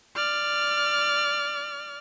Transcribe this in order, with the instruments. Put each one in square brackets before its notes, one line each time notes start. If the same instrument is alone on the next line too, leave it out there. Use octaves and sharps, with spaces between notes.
[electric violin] D5 F6